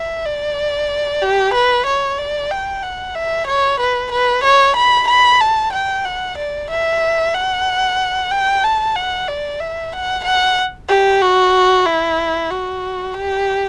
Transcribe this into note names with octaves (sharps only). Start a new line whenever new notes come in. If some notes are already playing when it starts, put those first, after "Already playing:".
Already playing: E5
D5
G4
B4
C#5
D5
G5
F#5
E5
C#5
B4
B4
C#5
B5
B5
A5
G5
F#5
D5
E5
F#5
G5
A5
F#5
D5
E5
F#5
F#5
G4
F#4
E4
F#4
G4